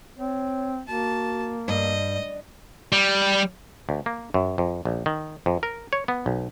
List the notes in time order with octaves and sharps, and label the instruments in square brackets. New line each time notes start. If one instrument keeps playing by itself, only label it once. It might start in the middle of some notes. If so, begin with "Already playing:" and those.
[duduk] C4 [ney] C#5
[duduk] A#3 [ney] F#4 [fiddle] A5
[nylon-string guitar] G2 [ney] D5 [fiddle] D#5
[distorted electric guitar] G3
[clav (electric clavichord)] D2
A#3
F#2
F2
A#1
D#3
F2
A#4
C#5
B3
B1